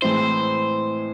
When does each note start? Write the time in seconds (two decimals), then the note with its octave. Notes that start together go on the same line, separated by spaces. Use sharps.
0.02 A2 E3 G#3 C4 E4 C5